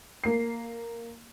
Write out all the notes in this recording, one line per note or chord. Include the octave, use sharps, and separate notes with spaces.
A#3 C7